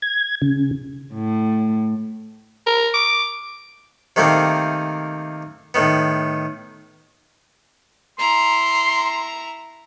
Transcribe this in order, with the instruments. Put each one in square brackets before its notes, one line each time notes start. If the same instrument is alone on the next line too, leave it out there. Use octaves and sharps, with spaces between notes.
[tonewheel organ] G#6
C#3
[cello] A2
[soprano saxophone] A#4
D6
[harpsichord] C3 D#3 A3 A#3 C4 A#4
A2 D#3 B3
[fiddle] E4 A#5 [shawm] C6